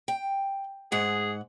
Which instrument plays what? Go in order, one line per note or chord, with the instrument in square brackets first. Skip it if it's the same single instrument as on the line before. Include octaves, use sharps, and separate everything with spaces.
[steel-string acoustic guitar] G5
[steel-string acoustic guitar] G#2 F#5 [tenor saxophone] G#4